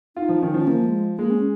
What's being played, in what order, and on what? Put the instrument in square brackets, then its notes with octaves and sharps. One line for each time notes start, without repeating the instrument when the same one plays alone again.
[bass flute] D#4 [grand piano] F4
[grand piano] F3
[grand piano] D#3 [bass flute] C#4
[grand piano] F3
[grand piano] F3 [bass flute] A#3
[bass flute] G#3
[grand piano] G#3 [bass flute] A#3
[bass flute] C#4